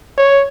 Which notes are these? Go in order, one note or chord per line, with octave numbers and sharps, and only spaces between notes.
C#5